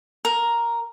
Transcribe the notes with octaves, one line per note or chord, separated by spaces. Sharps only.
A#4